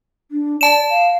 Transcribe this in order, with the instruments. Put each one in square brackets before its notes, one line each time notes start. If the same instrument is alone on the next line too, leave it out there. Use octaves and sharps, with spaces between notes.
[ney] D4
[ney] D5 [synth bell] A5 E7
[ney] F5